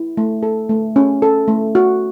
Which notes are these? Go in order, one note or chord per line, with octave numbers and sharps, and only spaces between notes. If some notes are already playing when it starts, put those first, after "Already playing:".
Already playing: E4
A3
A4
A3
C#4
A4
A3
F#4